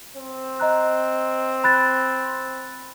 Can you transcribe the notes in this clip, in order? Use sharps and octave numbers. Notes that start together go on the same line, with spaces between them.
C4
D#5 A#5 F#6
B5 F#6 A6